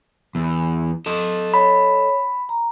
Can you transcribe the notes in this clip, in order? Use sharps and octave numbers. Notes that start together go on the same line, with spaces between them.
E2
A4 D#5
C#5 B5
A#5